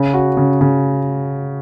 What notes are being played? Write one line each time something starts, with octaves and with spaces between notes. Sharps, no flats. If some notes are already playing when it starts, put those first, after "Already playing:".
Already playing: C#3
F#4
C#3
C#3